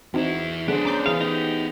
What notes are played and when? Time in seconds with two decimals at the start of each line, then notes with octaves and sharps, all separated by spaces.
0.14 E2 C4 D#4 E4 F#4
0.68 F#2 D3 B3 D4 G#4 C5
0.85 C#4 A#5 D6 G6
1.06 E3 G#4 F5 D#6
1.21 D#4 G4